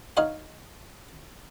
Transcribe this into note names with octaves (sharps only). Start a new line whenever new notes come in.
D#4 C#5 F5 F#5